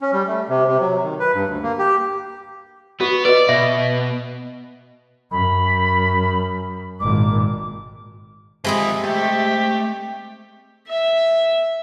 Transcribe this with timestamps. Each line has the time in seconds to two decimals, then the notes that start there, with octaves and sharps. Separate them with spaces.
0.01 C#4
0.13 G3
0.28 A3
0.49 C3
0.68 C3
0.81 F#3
1.03 D#3
1.19 B4
1.34 G2
1.47 D2
1.63 A#3
1.79 G4
3.00 B3 F#4
3.25 B4 D5 D#5
3.49 B2 E5
5.31 F#2 B5
7.00 G#1 A#2 D6
8.64 C3 F3 G#3 C4 G#4 B5
9.04 A3 G4
10.88 E5